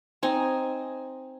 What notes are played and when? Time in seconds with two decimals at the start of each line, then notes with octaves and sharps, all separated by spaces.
0.23 C4 D#4 G#5